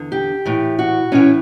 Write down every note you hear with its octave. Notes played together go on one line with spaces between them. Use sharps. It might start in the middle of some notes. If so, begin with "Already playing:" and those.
Already playing: E2 D3
G4
A2 E3
F#4
A2 E3 C#4